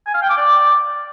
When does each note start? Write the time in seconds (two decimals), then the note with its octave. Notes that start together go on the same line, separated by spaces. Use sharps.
0.07 G#5
0.14 F5
0.22 G5
0.29 D6
0.37 D5